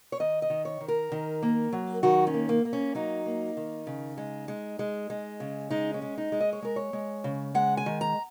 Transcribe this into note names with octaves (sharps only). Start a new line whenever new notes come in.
C#5
D#3 D#5
D#5
D#3
C#5
D#3
A#4
D#3
A#3
F#3
D#3 F#4
C#4
A#3
A#3
A#3
C#4
F#3 D#4
A#3
D#3
C#3
G#3
G#3
G#3
G#3
C#3
G#3 D#4
C#4
G#3
D#4
G#3
D#5
C#5
G#3 A#4
C#5
G#3
C#3
G#3 F#5
G#5
D#3
A#5